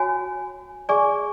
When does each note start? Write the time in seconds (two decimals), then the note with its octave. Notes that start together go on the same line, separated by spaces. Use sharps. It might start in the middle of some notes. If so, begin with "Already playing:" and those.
Already playing: F#4 C#5 G#5
0.89 G#4 D5 G#5 C#6